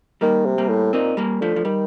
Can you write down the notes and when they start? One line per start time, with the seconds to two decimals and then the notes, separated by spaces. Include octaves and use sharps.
0.21 D#3 G3 A#3
0.46 C3
0.58 G3 A#3
0.69 A2
0.93 A#2 C4 D#4
1.17 G3 A#3
1.41 D3 F3 A3
1.56 F3
1.65 D#3 G3